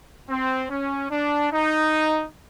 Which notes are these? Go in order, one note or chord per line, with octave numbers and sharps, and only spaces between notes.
C4
C#4
D4
D#4